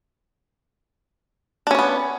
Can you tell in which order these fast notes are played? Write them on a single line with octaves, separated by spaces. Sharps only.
D4 C#4 C#5 B3